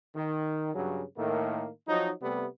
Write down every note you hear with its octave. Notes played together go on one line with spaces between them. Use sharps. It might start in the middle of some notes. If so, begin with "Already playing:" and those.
D#3
G2 C#3 F#3
A2 D#3 A3 A#3
F3 F#3 D#4
C3 G3 A3 B3